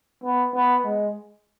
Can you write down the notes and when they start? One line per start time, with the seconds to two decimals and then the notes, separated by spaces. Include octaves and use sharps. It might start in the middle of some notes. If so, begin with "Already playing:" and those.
0.24 B3
0.55 B3
0.84 G#3